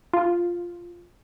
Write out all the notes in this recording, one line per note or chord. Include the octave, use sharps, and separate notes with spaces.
F4